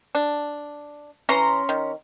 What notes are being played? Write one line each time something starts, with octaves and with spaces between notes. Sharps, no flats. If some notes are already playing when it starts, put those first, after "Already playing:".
D4
E3 C#4 A#5 C6
D#3